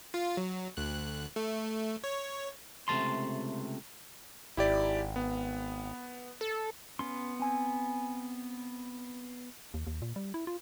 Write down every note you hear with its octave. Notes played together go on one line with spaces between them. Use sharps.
F4
F#3
D2 F#6
A3
C#5
C#2 C3 A3 A5 C6
G#1 E4 G4 D5
B3
A4
B3 C#4 C6
C4 G#5
D#2
D#2
A#2
G3
E4
F4